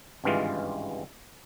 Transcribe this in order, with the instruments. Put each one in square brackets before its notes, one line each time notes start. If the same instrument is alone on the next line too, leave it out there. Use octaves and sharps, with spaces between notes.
[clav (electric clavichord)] G#1 C#2 G2 E3 G#3 F4